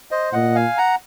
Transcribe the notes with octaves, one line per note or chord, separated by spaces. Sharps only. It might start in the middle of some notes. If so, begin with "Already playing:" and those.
C5 D#5
A#2 D#5 F#5
F5 G#5
F#5 A#5